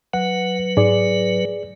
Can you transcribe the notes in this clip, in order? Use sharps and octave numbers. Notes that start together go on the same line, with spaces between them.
F#3 B4 F#5
G#2 G#4 D5